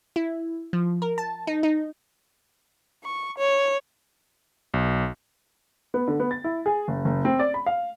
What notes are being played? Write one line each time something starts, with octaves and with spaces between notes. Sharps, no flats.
E4
F3
A#4
A5
D#4
D#4
C#6
C#5
B1
B3
D3
B3
A6
E4
G#4
F#1
F#1
C4
D5
B5
F5